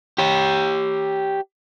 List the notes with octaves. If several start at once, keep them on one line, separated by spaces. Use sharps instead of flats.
G4 C#5